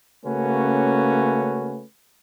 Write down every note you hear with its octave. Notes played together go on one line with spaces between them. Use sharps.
C#3 A3 A#3 C#4 F#4 B4